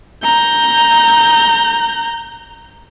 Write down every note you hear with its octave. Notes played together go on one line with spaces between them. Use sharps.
A#5 G6